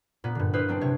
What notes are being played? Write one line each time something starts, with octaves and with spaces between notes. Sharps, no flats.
A#2 B3
G2 D3
E4 B4 C5 F5 D#6
F#3 C4 D4
C3 C#5